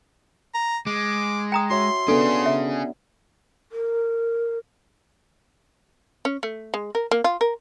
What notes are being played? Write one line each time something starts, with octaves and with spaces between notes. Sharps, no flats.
A#5
G#3 D6
G5 A#5 D#6
F#4 C#5 E5 C6
B3 C#4 D4 G#4 A4
E5
A#4
C#4
A3
G#3
A#4
A#3
F4
A#4